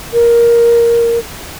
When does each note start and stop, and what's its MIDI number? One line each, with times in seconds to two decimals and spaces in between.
0.13 1.18 70